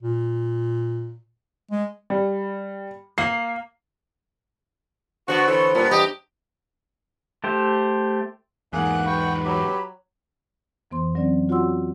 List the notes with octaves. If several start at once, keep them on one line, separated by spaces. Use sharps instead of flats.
A#2
G#3
G3
A#3 C7
D3 B3 F#4 C5
E3 A4 C#5
A#2 G3 B3 D4 B5
E2 G4 D#5 G5 A#5 B5
A3 G4 C5
E2 G#2 A#3 G#4 F#5 F#6
B4 G5 C#6
F#3 G4 B5
F2 E3 B3 C5 C6
F#3 C4 C#4 D5
F4 F#4 C#5 F#5 C6 E6